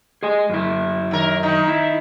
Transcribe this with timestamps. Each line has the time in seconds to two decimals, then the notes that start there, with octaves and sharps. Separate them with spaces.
0.23 G#4 D#5 G#5
0.50 F#2 E4
1.11 D#2 A#4
1.43 D#3 D#4
1.68 E4